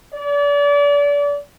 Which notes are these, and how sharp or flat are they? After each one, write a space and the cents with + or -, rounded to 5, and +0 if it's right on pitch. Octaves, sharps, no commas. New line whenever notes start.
D5 -35